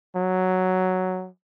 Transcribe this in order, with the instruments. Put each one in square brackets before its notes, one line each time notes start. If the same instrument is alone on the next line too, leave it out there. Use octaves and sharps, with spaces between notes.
[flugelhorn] F#3